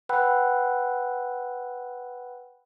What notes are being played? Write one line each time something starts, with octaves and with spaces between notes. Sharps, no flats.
B4 F#5 G5 B5 E6 F#6